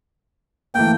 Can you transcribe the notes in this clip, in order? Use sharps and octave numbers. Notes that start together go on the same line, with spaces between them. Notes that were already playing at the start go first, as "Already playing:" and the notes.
E3 A3 A#3 G5